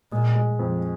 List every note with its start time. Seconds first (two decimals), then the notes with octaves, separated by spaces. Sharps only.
0.12 A#2 G#3
0.35 G#3
0.59 F2